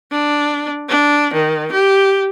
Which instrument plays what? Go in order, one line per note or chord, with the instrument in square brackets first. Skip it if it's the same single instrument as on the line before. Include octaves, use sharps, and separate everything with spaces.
[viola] D4
D4
D#3
G4